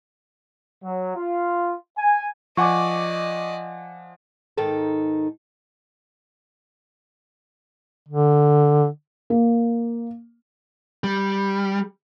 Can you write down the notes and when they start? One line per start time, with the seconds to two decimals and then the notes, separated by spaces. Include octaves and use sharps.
0.84 F#3
1.16 F4
1.98 G#5
2.57 F3 D5 D#5 F#5 G#5 C#6 D6
4.57 G#2 D#3 D#4 A4
8.09 D3
9.30 A#3
11.04 G3